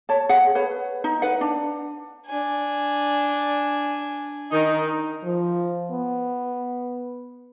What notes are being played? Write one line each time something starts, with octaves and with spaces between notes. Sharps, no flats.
C#5 A5
G#4 F#5
B4 C#5
D#4
B4 F#5
D4
D4 G#5
D#3 D#4
F3
B3